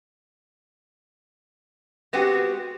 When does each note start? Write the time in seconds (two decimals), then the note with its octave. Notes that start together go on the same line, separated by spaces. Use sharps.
2.13 G#3 B3 C4 F#4 G4